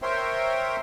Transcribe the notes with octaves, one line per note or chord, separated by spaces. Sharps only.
A#4 C5 C#5 E5 G5 C6